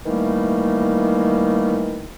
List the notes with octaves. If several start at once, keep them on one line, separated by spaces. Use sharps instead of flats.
D#3 E3 G3 A3 A#3